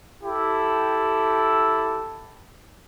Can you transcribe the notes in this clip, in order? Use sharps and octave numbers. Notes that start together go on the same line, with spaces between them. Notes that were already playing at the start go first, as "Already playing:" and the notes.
E4 G4 A4